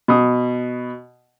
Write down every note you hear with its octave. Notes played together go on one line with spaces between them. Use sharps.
B2 D#6